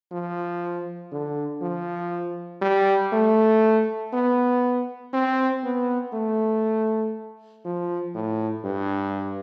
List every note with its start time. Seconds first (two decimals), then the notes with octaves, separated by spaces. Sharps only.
0.11 F3
1.12 D3
1.62 F3
2.62 G3
3.12 A3
4.13 B3
5.13 C4
5.64 B3
6.13 A3
7.65 F3
8.14 A2
8.64 G2